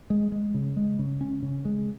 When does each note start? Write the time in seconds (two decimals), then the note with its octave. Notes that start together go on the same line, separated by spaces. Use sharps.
0.10 G#3
0.32 G#3
0.54 C#3
0.76 G#3
0.99 C#3
1.21 C#4
1.42 C#3
1.65 G#3